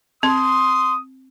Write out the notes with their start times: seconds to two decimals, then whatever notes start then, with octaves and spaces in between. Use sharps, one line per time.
0.23 C4 C6 D#6